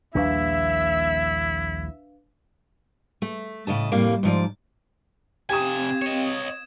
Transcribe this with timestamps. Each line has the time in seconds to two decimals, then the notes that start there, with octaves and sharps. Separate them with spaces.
0.15 A#1 D#2 G3 D4 E4 B4 E5 F5
3.22 A3
3.67 A2 C#3 D#5 A5
3.92 F2 A2 C3 G3 A#3 F5
4.23 G#2 F3 D5
5.50 C3 C4 G4 F5 G#5 D#6 G#6 E7
6.02 C#5 D#5 E7